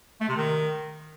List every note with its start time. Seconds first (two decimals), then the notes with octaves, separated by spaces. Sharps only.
0.21 A3
0.29 C3
0.37 D#3